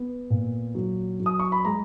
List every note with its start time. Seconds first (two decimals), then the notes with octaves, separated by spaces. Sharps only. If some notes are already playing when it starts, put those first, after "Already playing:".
Already playing: B3
0.30 A#2
0.75 F#3
1.20 F#3
1.26 D#6
1.40 C#6
1.52 B5
1.65 G#3 A#5